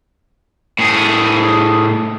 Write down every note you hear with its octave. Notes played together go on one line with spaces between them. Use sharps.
A2 G#4